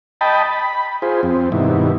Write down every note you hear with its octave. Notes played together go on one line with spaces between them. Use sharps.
D#5 G5 A5 B5
B5
F4 G#4 C5
F2 C4
G2 B2 D#3 E4